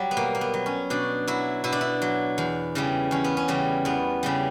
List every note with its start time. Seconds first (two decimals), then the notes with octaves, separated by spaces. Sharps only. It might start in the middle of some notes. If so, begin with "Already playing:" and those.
Already playing: F#3 G3
0.11 B3
0.17 B2 A#3
0.35 A#3
0.41 B3
0.54 F#3
0.66 C#4
0.90 B2 D4
1.27 F#3 E4
1.64 B2 E4
1.72 D4
1.81 E4
2.02 F#3
2.38 E2
2.75 C#3 E3 G3
3.11 E2 C#4
3.24 B3
3.37 C#4
3.48 C#3 E3 G3
3.85 E2 B3
4.23 C#3 E3 G3